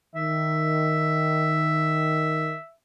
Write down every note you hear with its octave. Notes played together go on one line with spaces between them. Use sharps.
D#3 E5